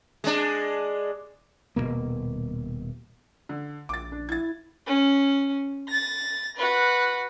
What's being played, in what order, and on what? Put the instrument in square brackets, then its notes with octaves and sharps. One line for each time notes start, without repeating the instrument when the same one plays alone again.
[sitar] G#3 D4
[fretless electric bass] D#1 F2 B2 A#3
[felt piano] D3
[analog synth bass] A#1 [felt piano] D6 A6
[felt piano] D4
[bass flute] E4 [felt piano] G#6 A6
[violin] C#4
A6 A#6
F#4 B4